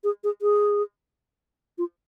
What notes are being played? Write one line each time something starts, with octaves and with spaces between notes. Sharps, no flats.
G#4
G#4
G#4
F4